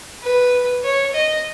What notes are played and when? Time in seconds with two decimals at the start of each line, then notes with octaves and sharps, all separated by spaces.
0.23 B4
0.83 C#5
1.14 D#5